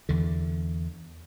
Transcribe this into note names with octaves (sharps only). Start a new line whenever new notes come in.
E2 D3